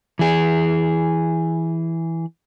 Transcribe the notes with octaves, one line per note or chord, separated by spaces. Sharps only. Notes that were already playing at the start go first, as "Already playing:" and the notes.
E3 G#4